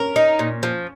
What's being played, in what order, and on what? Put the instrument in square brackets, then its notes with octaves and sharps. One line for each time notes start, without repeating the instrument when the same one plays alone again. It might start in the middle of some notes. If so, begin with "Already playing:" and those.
Already playing: [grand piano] C#4 [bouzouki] A#4
[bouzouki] D#4
A#2
F3